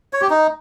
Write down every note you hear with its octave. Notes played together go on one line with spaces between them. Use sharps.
C#5
G4
D#4